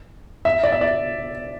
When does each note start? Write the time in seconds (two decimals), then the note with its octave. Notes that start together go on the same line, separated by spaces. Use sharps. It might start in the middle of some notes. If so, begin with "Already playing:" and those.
0.45 E5
0.63 D5
0.72 E5
0.81 D5